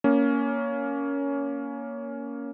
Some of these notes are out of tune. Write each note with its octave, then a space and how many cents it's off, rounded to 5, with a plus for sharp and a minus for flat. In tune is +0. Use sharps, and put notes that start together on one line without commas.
A#3 +5 C#4 +15